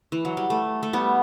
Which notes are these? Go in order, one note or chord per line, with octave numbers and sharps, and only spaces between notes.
E3
F#3
G3
A3
A3
G3 B3